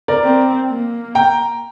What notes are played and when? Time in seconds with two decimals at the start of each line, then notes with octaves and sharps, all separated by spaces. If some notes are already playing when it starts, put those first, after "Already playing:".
0.08 A#4 D5
0.23 C4
0.69 A#3
1.15 G5 A#5